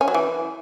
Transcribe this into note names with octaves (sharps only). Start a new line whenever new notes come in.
C#4
F#3
E3